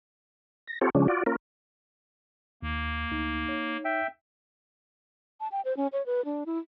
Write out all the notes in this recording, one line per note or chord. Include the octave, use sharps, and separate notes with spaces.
A#6
C4 F4 G4 A4 C#5
C#3 F3 G#3 C#4 D4
F4 F#4 D5
A#3 C#4 F4 A#4
D#2 A#3
D2 D#4
D#4 C#5
E5 G5
A5
G5
C5
C#4
C#5
B4
D4
E4